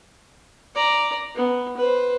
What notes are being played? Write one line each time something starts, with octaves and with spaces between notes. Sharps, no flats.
D5 A#5
B3
B4 C5